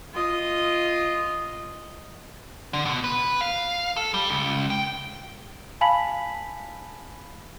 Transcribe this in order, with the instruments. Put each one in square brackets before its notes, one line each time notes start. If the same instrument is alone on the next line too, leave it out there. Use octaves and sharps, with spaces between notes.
[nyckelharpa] F4 D#5
[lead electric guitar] D3
B2
B4
F5
A4
G3
C#2
G5
[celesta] F5 G#5 A5 B5 B6 F#7